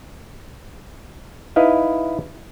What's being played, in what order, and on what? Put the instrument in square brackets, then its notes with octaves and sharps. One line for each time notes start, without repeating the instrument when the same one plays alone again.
[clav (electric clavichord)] D#4 E4 B4 D#5 F5